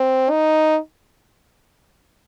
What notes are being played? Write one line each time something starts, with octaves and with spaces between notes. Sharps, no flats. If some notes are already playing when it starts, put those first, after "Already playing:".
Already playing: C4
D#4